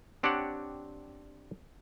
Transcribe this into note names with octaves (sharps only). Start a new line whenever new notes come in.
C4 D4 G4 C#5 D5 F#5